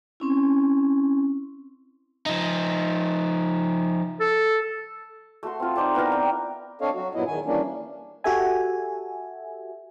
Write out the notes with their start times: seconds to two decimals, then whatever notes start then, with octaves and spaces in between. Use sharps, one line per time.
0.20 C4 C#4 E4
2.26 F3 D#4
4.20 A4
5.43 A3 F#4 C6
5.60 C4 F4
5.76 D#4 C5 D5 A5
5.95 B3 E4 A#4 F5
6.11 C4 A#4 D5 G5
6.81 C4 D4 A4 C#5 D#5 F5
6.95 F#3 F#4
7.15 G2 A#2 F#3 B3 E4 D#5
7.27 E2 D#3 G#5
7.46 E3 G3 A#3 C#4 D4
8.24 F#4 G4 A4 E5 G#5